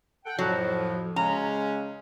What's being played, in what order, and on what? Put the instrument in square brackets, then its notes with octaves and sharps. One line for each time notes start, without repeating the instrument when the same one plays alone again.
[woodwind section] A4 F#5 G5
[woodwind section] F2 A2 F3 [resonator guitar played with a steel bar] F#3
[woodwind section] C#3 G#3 C#4 [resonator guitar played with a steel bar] A#5